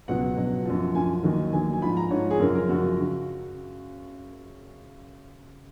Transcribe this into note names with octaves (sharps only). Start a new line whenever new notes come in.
C#2 B2 F#3 F#5
C#2 B2 F#3
F#2 F3
F#2 F3 G#5
D#2 D#3 F#3
D#2 D#3 F#3 G#5
G#5
G#2 F3 B5
A#5
G#2 F3 C#5
G#4
F#2 C#3 F3 A#4
A#4
F#2 C#3 F3 F#4
C#3